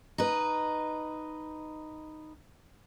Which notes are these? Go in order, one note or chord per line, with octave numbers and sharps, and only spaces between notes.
D#4 B4